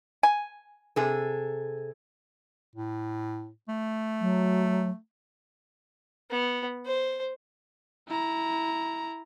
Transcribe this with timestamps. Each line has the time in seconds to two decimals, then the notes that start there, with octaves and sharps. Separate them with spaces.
0.23 G#5
0.96 C3 G#4 A4
2.76 A2
3.68 A3
4.21 F#3
6.30 B3
6.86 C5
8.08 E4 A#5